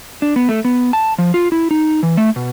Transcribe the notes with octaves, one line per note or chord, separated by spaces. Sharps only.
D4
B3
A3
B3
A5
F3
F4
E4
D#4
E3
A3
B2